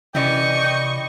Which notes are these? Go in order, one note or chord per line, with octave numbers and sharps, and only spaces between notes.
C3 E3 C#4 D5 D#5 G5 C#6